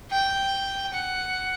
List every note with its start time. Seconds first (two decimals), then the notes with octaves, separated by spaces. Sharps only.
0.11 G5
0.93 F#5